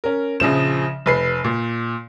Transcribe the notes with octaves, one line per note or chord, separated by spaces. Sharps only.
C#4 A#4
A#1 C#3 F3 E7
F1 B4 C7
A#2